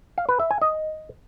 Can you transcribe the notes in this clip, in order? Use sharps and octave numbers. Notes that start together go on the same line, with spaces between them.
F5
B4
E5
G#5
D#5